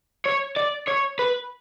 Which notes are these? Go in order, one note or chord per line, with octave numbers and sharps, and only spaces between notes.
C#5
D5
C#5
B4